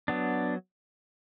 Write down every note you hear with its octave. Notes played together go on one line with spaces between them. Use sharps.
F#3 B3 D4